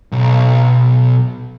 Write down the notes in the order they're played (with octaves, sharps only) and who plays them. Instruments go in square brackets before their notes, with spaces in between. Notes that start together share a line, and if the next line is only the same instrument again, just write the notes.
[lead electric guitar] B1